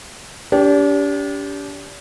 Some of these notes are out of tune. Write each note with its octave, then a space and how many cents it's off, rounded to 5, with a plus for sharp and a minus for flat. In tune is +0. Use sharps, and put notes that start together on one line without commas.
D4 -40 G4 +0